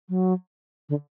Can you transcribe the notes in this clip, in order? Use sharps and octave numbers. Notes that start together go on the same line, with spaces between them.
F#3
D3